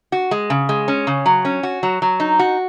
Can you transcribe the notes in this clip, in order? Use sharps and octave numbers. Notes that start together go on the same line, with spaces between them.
F#4
G#3
C#3
G#3
C#4
C#3
F#3
C#4
F#4
F#3
F#3
D#4
F#4